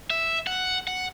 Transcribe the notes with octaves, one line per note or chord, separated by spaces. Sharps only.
E5
F#5
F#5